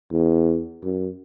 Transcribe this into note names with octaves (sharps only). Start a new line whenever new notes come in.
E2
F#2